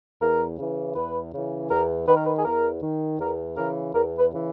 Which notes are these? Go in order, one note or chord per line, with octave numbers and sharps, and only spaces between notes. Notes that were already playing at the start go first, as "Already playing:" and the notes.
E2 A#4
C#3 E3
E2 B4
C#3 E3
E2 A#4
D#3 B4
A#4
B4
G#4
E2 A#4
D#3
E2 A#4
C#3 E3 A#4
E2 A#4
B4
C#3 E3